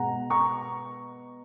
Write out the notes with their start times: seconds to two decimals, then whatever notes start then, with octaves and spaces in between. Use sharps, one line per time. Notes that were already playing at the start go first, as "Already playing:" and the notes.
Already playing: B2 G#3 B3 F#5 A#5
0.30 A#5 C#6